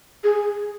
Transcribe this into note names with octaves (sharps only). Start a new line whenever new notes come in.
G#4